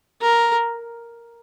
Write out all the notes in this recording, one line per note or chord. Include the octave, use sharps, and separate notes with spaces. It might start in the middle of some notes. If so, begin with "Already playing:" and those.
A#4